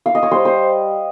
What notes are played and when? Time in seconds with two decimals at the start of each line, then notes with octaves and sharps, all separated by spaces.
0.06 F5
0.15 D#5
0.23 C#5
0.31 G3 C5
0.45 C5